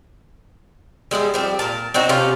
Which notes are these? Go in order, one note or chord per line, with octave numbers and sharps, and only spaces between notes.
G3 G#3 B3 E4
F3 G3 C4
A#2 A#4 A5
C4 D4 D#4 F#4
C3 C#4 F4 G4